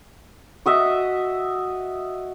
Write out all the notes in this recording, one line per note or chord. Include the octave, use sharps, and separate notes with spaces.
F#4 D#5 E5